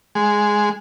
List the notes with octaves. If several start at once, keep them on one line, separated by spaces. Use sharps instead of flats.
G#3